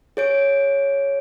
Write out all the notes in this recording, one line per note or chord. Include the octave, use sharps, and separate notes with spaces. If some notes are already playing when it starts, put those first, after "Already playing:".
G#4 C#5 D7